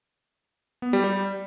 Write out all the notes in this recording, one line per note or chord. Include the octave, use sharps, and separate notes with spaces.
B3
G3
G3